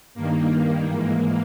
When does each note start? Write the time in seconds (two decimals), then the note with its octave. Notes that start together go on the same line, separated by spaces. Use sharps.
0.14 G2 D#3 A#3
0.86 G#2 E3 A#3